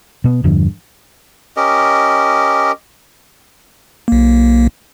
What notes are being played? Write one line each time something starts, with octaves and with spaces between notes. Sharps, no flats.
B2 B3
E2 G2 D3 F3
C#4 G4 A#4 D#5
B1 A#3